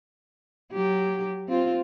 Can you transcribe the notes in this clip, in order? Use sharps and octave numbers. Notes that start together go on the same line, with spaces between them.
F#3 G4
C4 F4